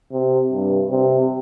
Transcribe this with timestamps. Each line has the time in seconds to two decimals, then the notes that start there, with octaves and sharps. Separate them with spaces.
0.12 C3
0.51 G2
0.90 C3